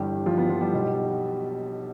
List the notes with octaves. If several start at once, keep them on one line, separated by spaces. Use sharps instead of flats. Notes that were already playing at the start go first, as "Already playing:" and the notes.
Already playing: G1 G2 E3 G3 G4
F3 F4
B3
F3 F4
G3 G4
B1 B2